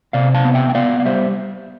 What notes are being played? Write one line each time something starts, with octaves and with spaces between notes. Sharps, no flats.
C3 D5 F5
F5 A5
B3
E5 G5
G5
B3 D5 F5
F5
G3 C5 E5